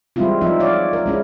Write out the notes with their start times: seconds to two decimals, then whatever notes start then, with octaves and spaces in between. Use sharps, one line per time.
0.16 E3 G3 G#3 C4 E4 F4
0.41 F3 C4 D#4 E5
0.60 D4 F4 C#5 D5 F5
0.93 A#4
1.06 G#3 C#4 E4